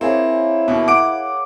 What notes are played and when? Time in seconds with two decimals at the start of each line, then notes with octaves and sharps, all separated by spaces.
0.01 A#3 C4 E4 G#4 C#5
0.68 D#2 B2
0.88 F#5 D6 D7